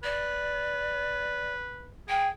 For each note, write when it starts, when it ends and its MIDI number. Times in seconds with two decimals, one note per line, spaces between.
0.03 1.92 71
0.03 1.52 74
2.08 2.29 68
2.08 2.27 79